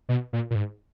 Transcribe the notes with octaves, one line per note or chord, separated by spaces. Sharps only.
B2
A#2
A#2
G#2